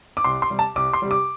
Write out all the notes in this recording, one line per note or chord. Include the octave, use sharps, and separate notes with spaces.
D6
C2 C6
C6
C3 G3
A5
C2 D6
C6
C3 G3
D6